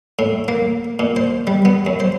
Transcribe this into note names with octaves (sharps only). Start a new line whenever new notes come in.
A2
A#3
A#2
C5
G3
B3
F#2
C5